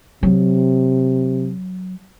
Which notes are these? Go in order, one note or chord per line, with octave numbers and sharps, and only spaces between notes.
C3 F#3